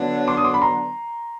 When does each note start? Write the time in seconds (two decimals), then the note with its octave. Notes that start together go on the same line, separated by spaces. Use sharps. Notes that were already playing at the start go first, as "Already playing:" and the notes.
Already playing: D3 F#3 B3 D4
0.28 C6 D6
0.37 D#6
0.44 C6 D6
0.54 B5
0.62 A#5 C6